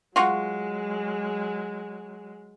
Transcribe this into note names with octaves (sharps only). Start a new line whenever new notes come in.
F#3 G#3 F4 F#4